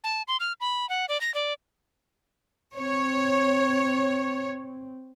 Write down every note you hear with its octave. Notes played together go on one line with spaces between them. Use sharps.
A5
C6
F6
B5
F#5
D5
A#6
D5
C4 C#5